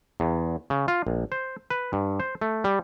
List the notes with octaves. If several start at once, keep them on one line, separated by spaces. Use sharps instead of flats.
E2
C#3
F4
A#1
C5
B4
G2
C5
A3
G3